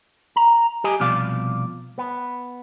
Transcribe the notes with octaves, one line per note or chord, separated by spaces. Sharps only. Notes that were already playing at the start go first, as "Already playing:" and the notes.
A#5
G4 D#5 G#5
C2 B2 F3 D5 F5
B3